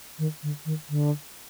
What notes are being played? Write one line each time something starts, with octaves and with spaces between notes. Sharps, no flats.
D#3
D3
D#3
D3